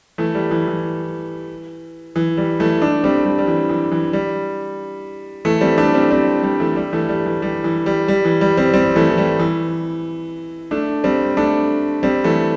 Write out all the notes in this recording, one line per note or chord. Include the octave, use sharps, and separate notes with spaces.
E3 A3
G3
E3
E3
E3
G3
E3 A3
A3 D4
G3 C4
G3
G3
E3
E3
E3
G3
E3 A3
G3 C4
A3 D4
G3 C4
G3 C4
G3
E3 A3
G3
E3 A3
G3
E3
G3
E3
G3
G3
E3
G3
G3 C4
G3 C4
E3 A3
E3
G3
E3
A3 D4
G3 C4
A3 D4
G3 C4
E3 A3